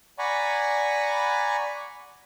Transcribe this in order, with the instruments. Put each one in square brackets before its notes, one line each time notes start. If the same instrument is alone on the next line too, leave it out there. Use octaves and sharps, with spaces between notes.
[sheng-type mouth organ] D5 F#5 G#5 A#5 B5 C#6